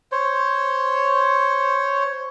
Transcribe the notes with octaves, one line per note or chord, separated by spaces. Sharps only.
C5 C#5